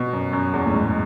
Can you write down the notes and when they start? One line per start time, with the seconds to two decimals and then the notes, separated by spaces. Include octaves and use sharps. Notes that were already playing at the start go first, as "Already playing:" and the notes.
Already playing: B2
0.13 F#2
0.33 F#2
0.53 E2
0.66 A2
0.74 G#2